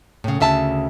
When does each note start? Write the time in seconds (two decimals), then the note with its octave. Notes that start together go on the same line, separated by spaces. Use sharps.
0.24 A2 C#3
0.40 D2 C#3 E5 A5